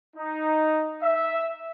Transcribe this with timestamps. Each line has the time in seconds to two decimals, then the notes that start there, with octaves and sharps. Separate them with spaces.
0.16 D#4
1.02 E5